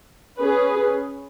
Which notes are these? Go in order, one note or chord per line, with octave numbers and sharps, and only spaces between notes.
C#4 G#4 B4